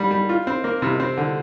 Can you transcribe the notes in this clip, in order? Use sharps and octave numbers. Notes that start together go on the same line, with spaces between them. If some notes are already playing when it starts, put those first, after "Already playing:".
Already playing: G#2 G3
G3
F4
C4
A#3
C3
C4
D3